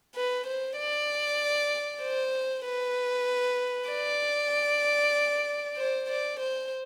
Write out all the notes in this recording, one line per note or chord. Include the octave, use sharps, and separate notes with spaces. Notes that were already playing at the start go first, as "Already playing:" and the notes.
B4
C5
D5
C5
B4
D5
C5
D5
C5